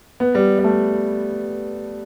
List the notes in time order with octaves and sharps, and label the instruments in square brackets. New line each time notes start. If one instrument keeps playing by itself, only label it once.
[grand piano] B3
G3
G3
A3